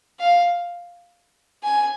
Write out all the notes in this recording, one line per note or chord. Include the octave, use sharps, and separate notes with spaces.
F5
G#5